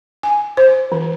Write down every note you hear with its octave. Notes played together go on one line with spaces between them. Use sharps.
G#5
C5
E3